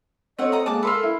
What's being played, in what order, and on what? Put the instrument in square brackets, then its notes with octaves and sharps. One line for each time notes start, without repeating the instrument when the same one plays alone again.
[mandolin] A3 F#5 [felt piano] C4 C#5 [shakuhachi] D#5
[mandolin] A3 A#5 D#6
[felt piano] G#3 [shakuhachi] A#3 [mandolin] A5 D6 F#6
[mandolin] F4 A4 [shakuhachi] A#4 [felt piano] B5 C6 E6
[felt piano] E4